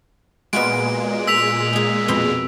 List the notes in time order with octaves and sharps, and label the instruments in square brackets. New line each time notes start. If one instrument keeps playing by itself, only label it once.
[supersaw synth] A#2 G#3 [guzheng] B3 F4 F#4 [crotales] D7
[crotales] E6 B6 F7
[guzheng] D#4 G#4
F2 B2 C6